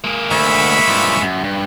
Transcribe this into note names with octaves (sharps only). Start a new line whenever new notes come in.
G#3 A#3
D2 E5 B5 C#6
G2 F3
F#2
G2